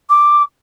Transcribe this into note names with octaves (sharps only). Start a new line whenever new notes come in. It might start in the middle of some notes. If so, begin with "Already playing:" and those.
D6